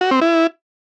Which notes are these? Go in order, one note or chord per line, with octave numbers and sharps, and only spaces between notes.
F#4
C4
E4